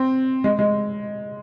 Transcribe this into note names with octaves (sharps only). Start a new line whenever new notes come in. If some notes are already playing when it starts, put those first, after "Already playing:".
Already playing: C4
G#3
G#3